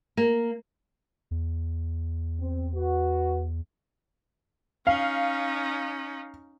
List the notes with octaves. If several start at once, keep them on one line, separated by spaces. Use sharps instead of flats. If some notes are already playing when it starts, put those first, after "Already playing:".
A#3
E2
C4
F#4 B4
C#4 D#4 F5